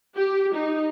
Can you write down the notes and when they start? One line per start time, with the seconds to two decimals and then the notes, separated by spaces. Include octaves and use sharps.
0.16 G4
0.53 D#4